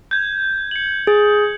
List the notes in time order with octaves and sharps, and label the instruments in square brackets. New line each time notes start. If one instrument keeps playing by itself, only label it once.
[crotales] G6 G#6
C#7 F#7
[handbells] G#4